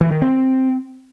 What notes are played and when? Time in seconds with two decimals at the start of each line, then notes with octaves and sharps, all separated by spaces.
0.01 E3
0.11 D#3
0.22 C4